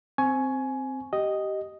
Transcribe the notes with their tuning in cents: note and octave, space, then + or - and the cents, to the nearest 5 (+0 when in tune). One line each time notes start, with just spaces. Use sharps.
C4 +0 G#5 +15 C#6 +0
G4 -15 D#5 +0